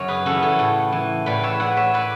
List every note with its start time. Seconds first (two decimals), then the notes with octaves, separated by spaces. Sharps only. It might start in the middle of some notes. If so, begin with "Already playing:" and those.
Already playing: F#2 C#3 C#5
0.08 G#4 B4
0.26 C#3 E3 F#4 A4
0.42 A4 C#5
0.59 A2
0.92 E3
1.26 A2 B4 D5
1.43 C#5 E5
1.60 E3 D5 F#5
1.77 C#5 E5
1.94 B4 D5